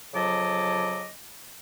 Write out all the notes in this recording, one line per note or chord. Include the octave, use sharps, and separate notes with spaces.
F2 C#3 F#3 D#5 A5 D6